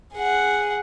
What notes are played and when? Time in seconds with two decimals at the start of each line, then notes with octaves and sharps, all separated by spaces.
0.14 G#4 F#5